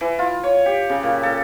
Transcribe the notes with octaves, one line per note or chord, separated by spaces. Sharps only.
E3
F4
C#5
G4
C#3
A#2
A4